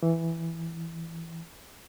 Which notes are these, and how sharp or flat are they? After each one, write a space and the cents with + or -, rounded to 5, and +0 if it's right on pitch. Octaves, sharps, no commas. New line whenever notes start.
E3 +5